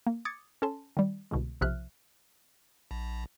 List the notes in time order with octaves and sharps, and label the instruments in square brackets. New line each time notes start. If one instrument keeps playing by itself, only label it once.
[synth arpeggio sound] A#3
D6 D#6 G#6 A6 C#7
C#4 A4 A5 C6
D#3 G3
C2 B2 D3 G#3
B1 C3 F3 E5 F6 F#6
[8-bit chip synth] A#1